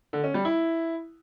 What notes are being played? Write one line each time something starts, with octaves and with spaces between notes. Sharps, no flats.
D3
C#4
G3
E4